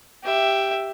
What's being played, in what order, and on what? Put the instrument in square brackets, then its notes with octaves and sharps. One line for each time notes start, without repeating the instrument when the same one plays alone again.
[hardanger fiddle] G4 E5